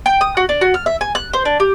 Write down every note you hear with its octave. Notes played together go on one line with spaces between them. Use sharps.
G5
D#6
F#4
D4
F#4
F6
E5
G#5
F#6
C5
D4
G4